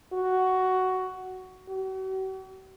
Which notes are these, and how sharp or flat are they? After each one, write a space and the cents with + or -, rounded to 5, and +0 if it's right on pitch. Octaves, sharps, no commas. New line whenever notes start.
F#4 +10
F#4 +45